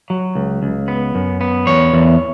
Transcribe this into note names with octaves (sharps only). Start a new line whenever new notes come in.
F#3
C#2
C#2
B3
F#2
B3
E2 C#5
E2